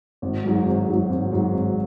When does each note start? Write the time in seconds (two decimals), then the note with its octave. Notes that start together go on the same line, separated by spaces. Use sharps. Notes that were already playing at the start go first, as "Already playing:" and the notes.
0.22 G#1
0.45 G#2 F#3
0.66 G#1
0.88 G#2 F#3
1.10 G#1
1.32 G#2 F#3
1.54 G#1